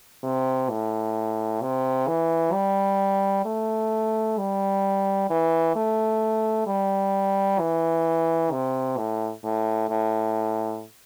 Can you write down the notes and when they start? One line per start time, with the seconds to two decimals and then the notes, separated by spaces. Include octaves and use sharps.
0.23 C3
0.70 A2
1.62 C3
2.07 E3
2.53 G3
3.45 A3
4.38 G3
5.30 E3
5.75 A3
6.67 G3
7.59 E3
8.52 C3
8.97 A2
9.44 A2
9.89 A2